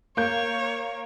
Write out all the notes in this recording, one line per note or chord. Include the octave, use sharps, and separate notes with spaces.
A#3 C#5 G6